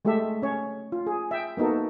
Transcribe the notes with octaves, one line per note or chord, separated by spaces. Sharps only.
G#3 A3 G4 A4 E5
C#4 C#5
F4
G#4
E5 G5
A#3 B3 D#4 F#4 A4